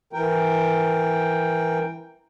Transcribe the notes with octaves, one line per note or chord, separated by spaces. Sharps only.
E3 A#4 G5